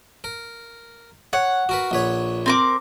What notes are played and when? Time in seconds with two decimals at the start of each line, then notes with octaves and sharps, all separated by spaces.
0.24 A#4
1.33 C#5 F#5
1.69 F#4 A#4 B4
1.91 A#1 B4 C#5
2.46 C4 A#4 D6